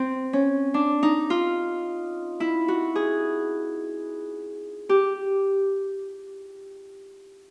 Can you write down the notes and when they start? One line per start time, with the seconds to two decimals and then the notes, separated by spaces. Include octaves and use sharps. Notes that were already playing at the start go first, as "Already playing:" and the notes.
Already playing: C4
0.33 C#4
0.74 D4
1.03 D#4
1.30 F4
2.40 E4
2.68 F#4
2.95 G#4
4.89 G4